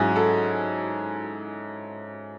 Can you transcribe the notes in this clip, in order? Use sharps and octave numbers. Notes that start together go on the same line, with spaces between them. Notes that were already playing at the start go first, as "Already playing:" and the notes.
Already playing: G#2 F#3 C#4 E4 G#4
A4